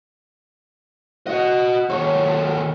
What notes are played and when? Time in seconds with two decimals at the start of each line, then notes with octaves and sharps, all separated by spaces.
1.27 F#4 D#5 F#5
1.89 D#2 A4 C#5